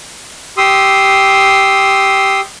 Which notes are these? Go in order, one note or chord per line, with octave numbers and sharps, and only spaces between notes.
G4 C6 D#6 E6